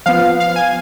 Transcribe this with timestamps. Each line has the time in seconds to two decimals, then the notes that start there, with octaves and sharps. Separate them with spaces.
0.06 F3 B3 F5
0.40 F5
0.56 G#5